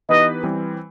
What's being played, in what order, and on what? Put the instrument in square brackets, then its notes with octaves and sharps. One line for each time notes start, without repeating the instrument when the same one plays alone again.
[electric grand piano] E3 B3 D#4 G4 B4 [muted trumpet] D#5
[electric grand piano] E3 G3 C4